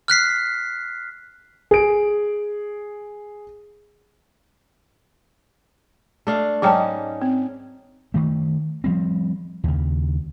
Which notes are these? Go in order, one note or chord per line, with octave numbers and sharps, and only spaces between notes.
F6 F#6 B6 C7
G#4 D7
A3 D4 F5
G#2 F#3 C#4 D#4 G5 A5
C4
D#3 A3
F3 G3 C4
D#2 C#3